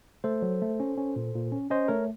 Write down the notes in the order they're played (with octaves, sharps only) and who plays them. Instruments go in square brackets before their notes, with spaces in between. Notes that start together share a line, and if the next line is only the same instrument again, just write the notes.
[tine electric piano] A3 A4 C5
F#3
A3
C#4
C#4
A#2
A#2
C#4
C#4 C5 D#5
A3 A#4 C#5